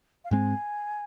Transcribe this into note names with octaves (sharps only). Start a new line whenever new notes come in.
F5
G#2 G#3 C4 G#5